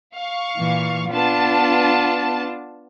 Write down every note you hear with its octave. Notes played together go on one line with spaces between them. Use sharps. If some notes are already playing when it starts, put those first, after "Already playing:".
F5 C#6
A#2 E3
B3 D4 F4 A5